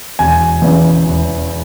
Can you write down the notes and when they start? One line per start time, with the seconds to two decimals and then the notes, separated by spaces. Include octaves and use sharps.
0.19 E1 G#5
0.62 E2 C#3 E3
1.05 E1